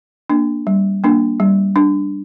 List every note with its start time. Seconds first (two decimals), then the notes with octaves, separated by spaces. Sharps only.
0.30 A#3 D4
0.67 G3
1.04 A#3 D4
1.40 G3
1.76 D4